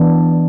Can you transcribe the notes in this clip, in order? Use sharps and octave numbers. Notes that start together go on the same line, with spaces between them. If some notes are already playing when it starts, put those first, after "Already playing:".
Already playing: E3 B3 D4